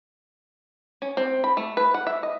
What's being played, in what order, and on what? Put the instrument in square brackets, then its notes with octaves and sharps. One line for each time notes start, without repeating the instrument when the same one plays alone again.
[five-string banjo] C#4
C4
B5
A3
B4
F#5
E5
D#5